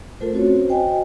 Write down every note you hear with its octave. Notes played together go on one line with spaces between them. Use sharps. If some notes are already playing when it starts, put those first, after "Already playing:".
A3 F4 A4 A#4 C5
C4 C#4 F#4 C5 C#5
F#4 C5 D#5 G5 G#5